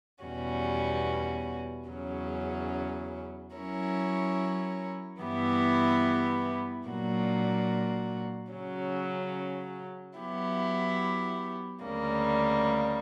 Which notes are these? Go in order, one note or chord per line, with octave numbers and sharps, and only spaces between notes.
E2 B2 G3 C#4 F#4
E2 C#3 F#3 C#4
F#3 C#4 E4 A#4 C#5
G2 E3 B3 E4 G4
A#2 F#3 A#3 D4 F#4
C#3 F#3 C#4
F#3 B3 E4 G4
D2 C#3 G3 A#3